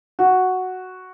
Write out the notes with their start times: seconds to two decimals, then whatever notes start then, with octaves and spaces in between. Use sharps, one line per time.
0.19 F#4